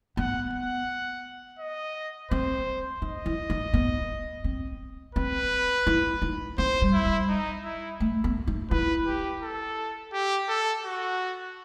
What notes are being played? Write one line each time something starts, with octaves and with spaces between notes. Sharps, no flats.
B3 F#5
F#5
D#5
C4 C5
D#4 D#5
E4
D#4
B3
C4
C4 B4
E4
D#4
C4 C5
G3
E4
G3
D#4
E4
A3
B3
D#4
E4 B4
G4
A4
G4
A4
F#4